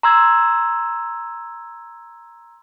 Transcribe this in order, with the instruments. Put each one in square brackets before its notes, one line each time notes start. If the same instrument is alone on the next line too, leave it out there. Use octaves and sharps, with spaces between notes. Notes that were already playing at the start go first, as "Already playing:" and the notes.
[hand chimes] A#5 C6 E6 G#6